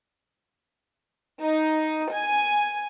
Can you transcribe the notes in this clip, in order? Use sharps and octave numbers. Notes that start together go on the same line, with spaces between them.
D#4
G#5